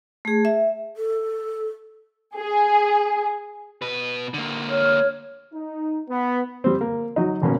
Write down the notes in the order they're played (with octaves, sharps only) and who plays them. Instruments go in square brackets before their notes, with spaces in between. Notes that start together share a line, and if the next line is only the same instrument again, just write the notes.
[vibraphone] A3 G#4
E5
[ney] A4
[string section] G#4
[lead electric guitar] B2 B4
D3 A#3
[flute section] C#5 F6
[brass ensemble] D#4
B3
[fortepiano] G3 C4
A#3
F#3 D#4
G#1 B2 A#3 C#4